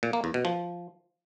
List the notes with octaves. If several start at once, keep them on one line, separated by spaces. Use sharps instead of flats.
A#2
A#3
E2
B2
F3